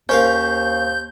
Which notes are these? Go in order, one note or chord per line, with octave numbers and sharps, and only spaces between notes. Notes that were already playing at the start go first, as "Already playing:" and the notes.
D#2 C#4 A#4 C5 F5 G6